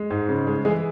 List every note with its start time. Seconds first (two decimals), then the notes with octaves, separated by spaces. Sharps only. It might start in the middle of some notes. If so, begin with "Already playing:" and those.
Already playing: G#3
0.10 G#2
0.29 C#3
0.47 G#3
0.65 E3 G#3 G#4